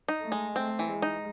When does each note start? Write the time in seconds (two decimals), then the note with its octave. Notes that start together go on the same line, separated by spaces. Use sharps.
0.08 D#4
0.21 A3
0.32 G#3
0.55 A3 C4
0.79 E3
0.90 G#3
1.02 D#4